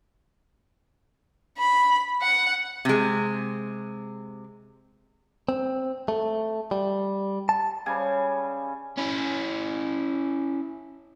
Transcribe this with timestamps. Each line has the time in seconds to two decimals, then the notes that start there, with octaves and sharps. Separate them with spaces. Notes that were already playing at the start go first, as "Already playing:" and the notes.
1.58 B5
2.22 F#5
2.85 C3 G#3
5.49 C4
6.08 A3
6.71 G3
7.49 A5
7.86 C#3 G3 G#5
8.97 C#4 E4